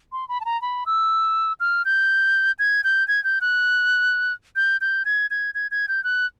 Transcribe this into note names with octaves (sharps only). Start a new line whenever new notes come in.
C6
B5
A5
A#5
B5
E6
F6
G6
G#6
G6
G#6
G6
F#6
G6
G6
G#6
G#6
G#6
G#6
G6
F#6